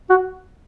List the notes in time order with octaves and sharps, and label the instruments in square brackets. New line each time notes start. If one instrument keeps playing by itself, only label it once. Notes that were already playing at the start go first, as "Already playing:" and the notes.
[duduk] F#4